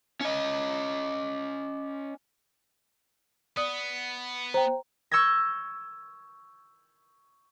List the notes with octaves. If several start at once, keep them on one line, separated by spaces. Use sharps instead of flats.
C#4 D#5
B3 D5 D#6
C5 G5 A#5
C#6 E6 G6 G#6 A#6